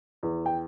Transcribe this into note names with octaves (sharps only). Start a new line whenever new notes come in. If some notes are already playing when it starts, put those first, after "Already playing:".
E2
G5